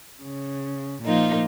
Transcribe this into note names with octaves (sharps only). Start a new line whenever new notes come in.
C#3
A#2 F3 A#3 D#4 F4